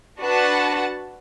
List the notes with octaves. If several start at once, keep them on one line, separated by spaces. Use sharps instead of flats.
D4 F#4 B4 F#5 A5